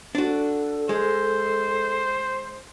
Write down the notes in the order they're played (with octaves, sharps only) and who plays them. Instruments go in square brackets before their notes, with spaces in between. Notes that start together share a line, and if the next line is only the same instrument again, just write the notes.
[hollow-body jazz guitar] D4 F#4 [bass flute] A4
[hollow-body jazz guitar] G#3 [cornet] C5